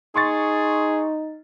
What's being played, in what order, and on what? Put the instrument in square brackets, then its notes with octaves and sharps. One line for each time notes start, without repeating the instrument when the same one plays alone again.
[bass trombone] D#4 [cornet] G#4 [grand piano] C6 C#6 A6